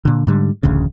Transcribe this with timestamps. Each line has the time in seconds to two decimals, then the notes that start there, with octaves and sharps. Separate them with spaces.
0.05 A#2 D3
0.27 G#2 D3 G3
0.63 D1 A1 D2 C#3